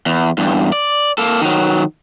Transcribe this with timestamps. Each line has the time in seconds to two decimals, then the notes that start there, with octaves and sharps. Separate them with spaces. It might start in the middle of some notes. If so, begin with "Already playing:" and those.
0.06 E2
0.38 E2 G2
0.72 D5
1.18 A#3 A4
1.41 D#3 F#3